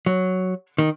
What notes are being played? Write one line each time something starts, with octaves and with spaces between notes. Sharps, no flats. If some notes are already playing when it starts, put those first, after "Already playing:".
F#3
D#3